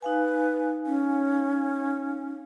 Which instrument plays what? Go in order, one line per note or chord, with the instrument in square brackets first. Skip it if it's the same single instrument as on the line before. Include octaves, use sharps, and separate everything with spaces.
[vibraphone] D#4 F5 G#5 [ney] B4
[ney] C#4